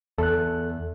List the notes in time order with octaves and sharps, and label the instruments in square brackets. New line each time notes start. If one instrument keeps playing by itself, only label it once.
[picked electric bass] E2 [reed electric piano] A4 F#6